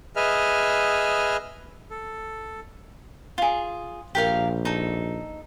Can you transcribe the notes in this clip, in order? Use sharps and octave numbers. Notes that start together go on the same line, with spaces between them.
G#4 B4 D#5 E5 F6
A4
F4 G#4
A#1 G4 A#4 F5
D#4 A4